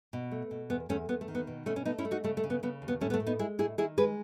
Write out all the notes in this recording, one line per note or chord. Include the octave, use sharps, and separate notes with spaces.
B2
A3
B2
E2 B3
E2 A3 C#4
E2 B3
A3
D#3
B3
B2
B2 A3 C#4
C#4
A3 B3 D#4
C#4 E4
A3
D#4 F#4
C#3 A3
A3
C#3
B3
C#3 B3
D#2
B3
A2 A3 C#4
B3
A3
A2
B3 D#4
G#3 E4 G#4
A2 E4 G#4
D#3 E4 G#4
G#3 G#4 B4